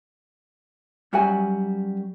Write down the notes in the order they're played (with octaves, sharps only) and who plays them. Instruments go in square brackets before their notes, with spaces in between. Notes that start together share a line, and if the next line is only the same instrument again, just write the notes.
[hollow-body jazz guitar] F#2 G3 F#4 [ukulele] A#4 G#5